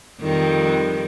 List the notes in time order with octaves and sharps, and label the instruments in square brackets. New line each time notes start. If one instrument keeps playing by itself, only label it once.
[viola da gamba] F2 D#3 G3